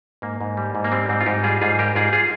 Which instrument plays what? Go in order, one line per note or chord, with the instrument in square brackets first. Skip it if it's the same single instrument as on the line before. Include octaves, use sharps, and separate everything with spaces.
[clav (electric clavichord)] G#2 A#3
G#2
G3
G#2
A#3
G3 C4
G#2 C4
F4
G#2 D#4 G4
G3 F4 G#4
G#2 F4 G#4
G3 G4 A#4
G#2 F4 G#4
F4 G#4